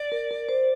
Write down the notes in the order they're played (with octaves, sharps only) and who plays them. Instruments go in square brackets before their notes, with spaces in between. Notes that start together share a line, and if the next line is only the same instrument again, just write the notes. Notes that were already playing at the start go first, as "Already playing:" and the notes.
Already playing: [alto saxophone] D5
[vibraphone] A#4
A#4
C5